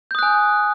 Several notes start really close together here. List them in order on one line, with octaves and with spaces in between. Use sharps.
G6 D#6 F#6 G#5